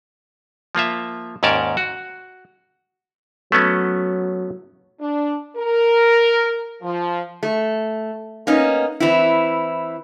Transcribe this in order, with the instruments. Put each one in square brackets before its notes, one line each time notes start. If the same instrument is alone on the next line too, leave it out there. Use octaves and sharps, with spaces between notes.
[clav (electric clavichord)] F3 A#3 F4 E5
D#2 G#2 C#4 A#4 D5 A5
F#4
[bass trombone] F#3 [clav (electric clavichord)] A3 B3 C#4
[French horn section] D4
A#4
F3
[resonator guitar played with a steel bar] A3
A#3 B3 C#4 D#4
E3 C4 E4